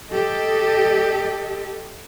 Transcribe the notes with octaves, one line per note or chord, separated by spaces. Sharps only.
G4 A4 D#5